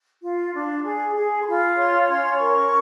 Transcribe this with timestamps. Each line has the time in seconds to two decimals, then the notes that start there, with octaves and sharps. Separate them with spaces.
0.23 F4
0.54 D4
0.85 G#4
1.16 G#4
1.42 C6
1.47 F4 B5
1.77 C#5 C6
2.08 C#4 C6
2.38 A#4 C#6